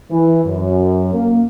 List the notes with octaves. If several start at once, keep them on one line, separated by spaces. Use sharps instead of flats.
E3
F#2
A#3